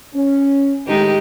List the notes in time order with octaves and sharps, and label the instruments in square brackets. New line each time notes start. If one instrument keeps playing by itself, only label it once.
[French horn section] C#4
[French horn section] A2 D#3 [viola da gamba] G#3 D#4 G4